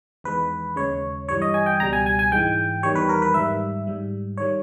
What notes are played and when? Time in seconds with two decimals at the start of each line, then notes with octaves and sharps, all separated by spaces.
0.24 E2 D#3 G#3 B4
0.76 D#2 C#3 G#3 C#5
1.29 G2 E3 G3 C#5
1.42 D#5
1.54 G#5
1.66 G5
1.80 C#2 B2 G3 A#5
1.93 G#5
2.06 G#5
2.19 G#5
2.32 G#2 E3 G#3 G5
2.83 E2 D#3 G3 C#5
2.95 B4
3.09 A#4
3.22 B4
3.34 G#2 D#3 G3 E5
3.87 G#2 G3
4.38 D#3 G3 C#5